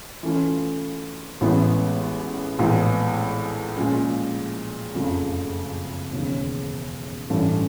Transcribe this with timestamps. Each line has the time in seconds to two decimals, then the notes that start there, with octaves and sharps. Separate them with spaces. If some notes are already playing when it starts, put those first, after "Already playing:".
0.23 E3 A3 C#4 F4
1.41 A1 A2 E3 G#3 B3
2.59 A#1 A2 E3 G#3 B3
3.77 A#2 F3 G#3 C#4
4.94 F#1 F2 C#3 F3 A3
6.12 E1 D#2 C#3
7.30 A1 G2 E3 A3 C#4